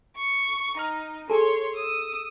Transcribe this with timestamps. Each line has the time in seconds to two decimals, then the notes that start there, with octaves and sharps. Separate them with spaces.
0.16 C#6
0.77 D#4 A#5 F6
1.30 G#4 A4 C#5 C6
1.75 D#6 E6